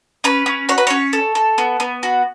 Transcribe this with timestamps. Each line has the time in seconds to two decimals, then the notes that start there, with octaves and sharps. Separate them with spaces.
0.24 C#4 B4
0.46 C#4
0.69 F#4 C#5
0.78 B4
0.87 C#4 C#5
1.13 A4
1.35 A4
1.58 B3
1.80 B3
2.03 F#4